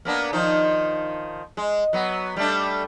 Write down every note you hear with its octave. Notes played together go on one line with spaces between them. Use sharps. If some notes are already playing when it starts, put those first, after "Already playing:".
A#3 B3 D4
D#3 F3 D#4
G#3
F#3 B3
G3 A3 D4